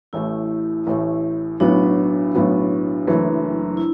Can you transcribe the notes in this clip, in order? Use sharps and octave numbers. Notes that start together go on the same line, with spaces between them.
A1 A2 A3 E4
A1 A2 A3
B1 A2 F#3 B3 D4
B1 A2 F#3 B3
F#1 F#2 E3 A3
E4